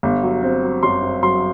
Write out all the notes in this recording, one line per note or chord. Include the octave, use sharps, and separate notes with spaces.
G1
F#3
C4
F#3
F#2 C6
C4
F#3 C6